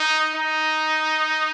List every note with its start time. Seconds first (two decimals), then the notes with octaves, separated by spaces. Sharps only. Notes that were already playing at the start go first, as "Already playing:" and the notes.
Already playing: D#4
0.36 D#4